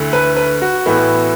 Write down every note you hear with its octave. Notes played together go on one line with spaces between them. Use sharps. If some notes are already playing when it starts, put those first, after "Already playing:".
Already playing: D2 D3 A3 E4
B4
B4
F#4
A2 E3 B3 E4